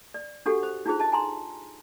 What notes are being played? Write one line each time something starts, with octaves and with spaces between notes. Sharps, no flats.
D5
D4 F#4 G4 A4 F#5
C5
D4 D#4 F4 G#4 C5
D#5 A5
G#5 A#5 C6